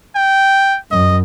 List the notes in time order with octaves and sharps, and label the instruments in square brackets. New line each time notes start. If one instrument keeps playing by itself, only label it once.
[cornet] G5
[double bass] F#2 [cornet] D#5